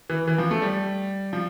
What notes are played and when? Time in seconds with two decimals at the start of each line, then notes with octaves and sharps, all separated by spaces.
0.10 E3
0.27 E3
0.38 F3
0.51 A3
0.62 G3
1.33 F3